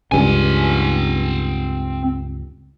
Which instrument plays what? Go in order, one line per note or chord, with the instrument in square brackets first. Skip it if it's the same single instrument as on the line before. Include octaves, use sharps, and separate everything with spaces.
[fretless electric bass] C#2 G2 C#3 [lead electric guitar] C4 G#5